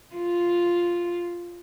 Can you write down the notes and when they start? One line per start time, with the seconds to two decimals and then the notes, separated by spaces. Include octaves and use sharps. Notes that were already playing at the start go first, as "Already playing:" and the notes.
0.16 F4